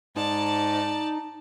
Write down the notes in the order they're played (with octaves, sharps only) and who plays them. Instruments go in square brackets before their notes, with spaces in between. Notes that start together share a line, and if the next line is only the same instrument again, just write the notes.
[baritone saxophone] G#2 [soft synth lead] D#4 [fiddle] D5 A5